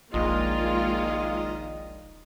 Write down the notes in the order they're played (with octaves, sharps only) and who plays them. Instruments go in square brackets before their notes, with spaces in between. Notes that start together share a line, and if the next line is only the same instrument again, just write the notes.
[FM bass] D#1 [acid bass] A#1 [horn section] D#3 D#5 [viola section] G#3 A#3 F4